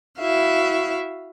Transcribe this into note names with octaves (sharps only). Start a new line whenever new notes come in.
E4 F#4 E5 F5